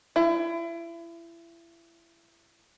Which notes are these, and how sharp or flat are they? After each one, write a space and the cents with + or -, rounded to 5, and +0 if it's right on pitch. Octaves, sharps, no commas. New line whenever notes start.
E4 +30